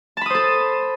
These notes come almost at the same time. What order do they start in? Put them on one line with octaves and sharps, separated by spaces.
A5 B5 D#6 C5 A4